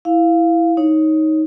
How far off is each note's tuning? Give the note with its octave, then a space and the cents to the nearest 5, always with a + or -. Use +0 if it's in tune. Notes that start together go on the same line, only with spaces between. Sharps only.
E4 +0 F5 +0
D#4 +10 C#5 +0